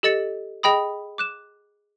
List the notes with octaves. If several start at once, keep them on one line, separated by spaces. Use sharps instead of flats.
G4 A4 D#5 A6 C#7
G#4 D#5 G5 B5 D#6
D6 F#6 E7